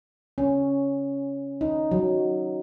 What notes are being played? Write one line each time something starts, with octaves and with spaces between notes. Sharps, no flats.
C#4
D#4
F#3